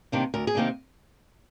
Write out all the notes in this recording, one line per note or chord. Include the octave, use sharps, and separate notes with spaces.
C3 D#3 A#3 D4
D2 A#4
G#4
C3 D#3 A#3 D4